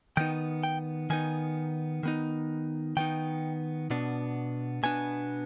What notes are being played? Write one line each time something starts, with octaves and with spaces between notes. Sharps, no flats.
D#3 B3 D#4 G5
G5
D#3 B3 D#4 G#5
D#3 B3 D#4
D#3 B3 D#4 G5
B2 B3 D4
B2 B3 D4 G#5